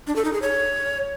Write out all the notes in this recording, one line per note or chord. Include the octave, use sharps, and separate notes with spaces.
D4
A4
D#4
G#4
C#5